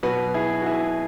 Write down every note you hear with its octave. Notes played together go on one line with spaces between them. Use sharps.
B2 F#3 F#4 B4
E4 G#4
F#4
E4 G#4